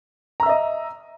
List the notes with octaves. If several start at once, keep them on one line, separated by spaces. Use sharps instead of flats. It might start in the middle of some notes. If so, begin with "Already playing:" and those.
D#5 E5 A#5 E6